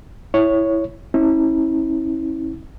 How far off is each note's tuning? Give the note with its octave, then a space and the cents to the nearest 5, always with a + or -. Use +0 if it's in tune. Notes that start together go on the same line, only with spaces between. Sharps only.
E4 +0 C#5 +0
C#4 -40 E4 -30